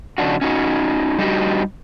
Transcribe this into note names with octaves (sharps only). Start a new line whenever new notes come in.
C#3 F3 D4 D#4 F#4
C#4 D#4 F#4
G3 D4 D#4 F#4 G4